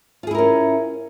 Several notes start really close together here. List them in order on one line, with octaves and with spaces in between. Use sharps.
F4 G#4 E4 A#4 C#4